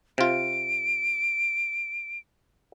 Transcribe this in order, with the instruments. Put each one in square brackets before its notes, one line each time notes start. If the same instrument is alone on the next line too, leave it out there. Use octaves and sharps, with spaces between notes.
[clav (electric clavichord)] C3 F4 [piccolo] D7